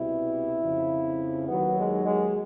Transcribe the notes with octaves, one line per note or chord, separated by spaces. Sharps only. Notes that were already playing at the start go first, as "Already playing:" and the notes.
Already playing: C2 B2 G3 E4
F2 C#3 F3
D#2 D#3 F#3 B3
G#3
G#3